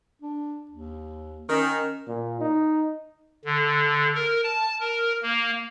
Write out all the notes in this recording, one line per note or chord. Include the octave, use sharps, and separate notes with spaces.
D4
D#2
D#3 C#4
A#2
D#4
D3
A#4
A5
A#4
A#3